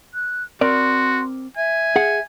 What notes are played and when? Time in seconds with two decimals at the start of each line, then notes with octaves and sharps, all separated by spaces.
0.14 F#6
0.61 C4 F#4 A#4 D5 C6
1.57 E5 G#5
1.96 G#4 F#5